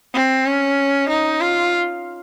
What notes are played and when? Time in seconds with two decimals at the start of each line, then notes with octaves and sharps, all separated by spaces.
0.14 C4
0.45 C#4
1.09 D#4
1.41 F4